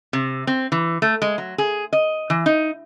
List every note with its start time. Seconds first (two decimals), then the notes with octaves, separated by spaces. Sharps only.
0.13 C3
0.47 C4
0.72 E3
1.02 A3
1.22 G#3
1.38 F#3
1.58 G#4
1.93 D#5
2.30 E3
2.46 D#4